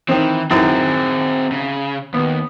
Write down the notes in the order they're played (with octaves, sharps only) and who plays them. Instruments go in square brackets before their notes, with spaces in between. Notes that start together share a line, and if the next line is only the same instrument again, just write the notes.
[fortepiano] D#3 C4 [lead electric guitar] E3
[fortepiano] F#2 D#3 E3 [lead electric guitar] C4 G#4
[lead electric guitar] C#3
[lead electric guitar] D#2 [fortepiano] B3